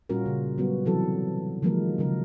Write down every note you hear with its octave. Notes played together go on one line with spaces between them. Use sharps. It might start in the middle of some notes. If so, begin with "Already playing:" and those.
A#2 G3 C#4 F4 F#4 A#4
C#3 G#4
F#3 G3 B3 F#4
C3 E3 F#3 A4
D#3 F3 F#3 G#3 A#3 A#4
C#3 F#3 A#4